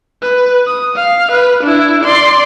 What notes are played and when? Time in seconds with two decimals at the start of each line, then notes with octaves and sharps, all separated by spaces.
0.22 B4
0.67 D#6
0.96 F5
1.32 B4
1.63 D4 E4
2.04 D5 C6